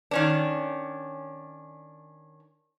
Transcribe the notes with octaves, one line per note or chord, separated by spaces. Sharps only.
D#3 C#4 D4